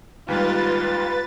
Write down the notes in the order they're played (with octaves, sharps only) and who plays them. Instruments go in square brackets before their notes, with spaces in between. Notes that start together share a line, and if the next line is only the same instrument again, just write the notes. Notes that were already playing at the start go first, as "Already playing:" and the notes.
[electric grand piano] D#2 G#2 G3 [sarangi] F4 [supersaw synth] B4 A6